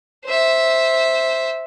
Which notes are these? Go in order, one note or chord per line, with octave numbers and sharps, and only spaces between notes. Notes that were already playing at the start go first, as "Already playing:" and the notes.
C5 E5